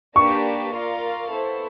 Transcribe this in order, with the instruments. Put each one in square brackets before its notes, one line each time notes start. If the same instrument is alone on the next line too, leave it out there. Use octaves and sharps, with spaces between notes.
[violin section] A#3 D4 G4 B4 D5 [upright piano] C#6
[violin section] F4 A#4 D5 F5
B3 E4 A4 C5